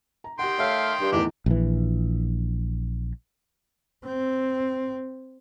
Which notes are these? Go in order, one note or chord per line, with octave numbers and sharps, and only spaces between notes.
A#5
D#3 G4 F#5 G5 C6
A3 C#5 E5 F5
G2
E2 A2 D#3 D4 G4 D5
A#1 E3
C4